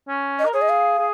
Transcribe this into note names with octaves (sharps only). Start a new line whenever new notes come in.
C#4
D#5
A#4
G#4 C#5
D#5
F5
G#4